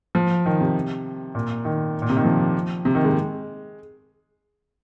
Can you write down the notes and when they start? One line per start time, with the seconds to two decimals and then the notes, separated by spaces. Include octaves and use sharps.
0.15 F3
0.46 D#3
0.61 C3
1.35 A#2
1.65 D#3
2.02 A#2
2.10 C3
2.17 D#3
2.24 F3
2.85 C3
2.95 D#3
3.04 G#3